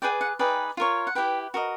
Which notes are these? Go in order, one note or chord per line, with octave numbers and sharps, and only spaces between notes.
G#4 B4 D5 G5
F#5
D#4 G#4 B4 D5 G5
F4 A#4 C#5
F#5
E4 G4 B4 G5
F#4 A#4 D#5